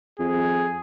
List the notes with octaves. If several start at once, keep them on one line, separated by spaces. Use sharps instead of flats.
F2 G#4